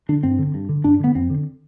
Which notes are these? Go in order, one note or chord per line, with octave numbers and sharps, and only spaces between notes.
D3 D4
G2 C4
D3
G2
D3
G2 D4
D3 B3
F2 C4
D3